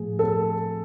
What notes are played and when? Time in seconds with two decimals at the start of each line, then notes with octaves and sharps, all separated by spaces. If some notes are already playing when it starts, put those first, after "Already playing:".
Already playing: A2 F3 G#4
0.19 A4